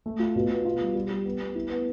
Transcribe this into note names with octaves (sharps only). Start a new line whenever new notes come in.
A3
F4
B2
B3
F4
G3
G3
G4
B3
B3
E4
B3